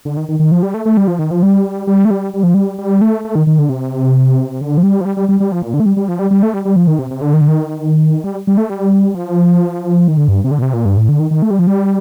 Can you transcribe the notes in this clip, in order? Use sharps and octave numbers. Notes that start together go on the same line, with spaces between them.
D3
D#3
D#3
D#3
F3
G3
A3
A3
G3
F3
D#3
F3
G3
G3
A3
G3
G3
F3
G3
G3
A3
A3
D#3
D#3
D3
C3
D3
F3
G3
F3
G3
G3
G3
G3
F3
A#2
D3
A3
G3
G3
F3
G3
G3
A3
G3
G3
F3
D#3
C3
C3
D3
D#3
D3
D#3
G3
G3
A3
G3
F3
D#3
D3
G2
C3
D3
A#2
C3
A#2
G2
A2
D3
D#3
D#3
A3
G3
F3
G3